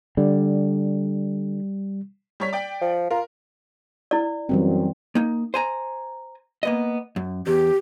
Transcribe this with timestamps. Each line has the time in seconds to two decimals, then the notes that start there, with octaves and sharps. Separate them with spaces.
0.17 D3 G3
2.40 G3 C#5 B6
2.53 D5 G5
2.82 F3
3.11 F4 A#4
4.11 E4 D5
4.49 F#2 E3 G3 C4
5.15 A#3 D#4
5.54 C5 G#5 A#5
6.63 A#3 B3 D#5
7.16 F#2
7.47 E2 G4